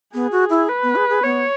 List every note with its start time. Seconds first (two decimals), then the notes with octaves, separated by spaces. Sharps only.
0.14 B3 G#4
0.32 F#4
0.50 E4
0.68 B4
0.83 B3
0.96 G#4
1.09 G#4
1.23 B3 C#5